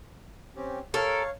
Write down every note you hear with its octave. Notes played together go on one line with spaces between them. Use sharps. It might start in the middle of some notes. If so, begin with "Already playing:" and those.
C4 C#4 G4
A4 A#4 C#5 F5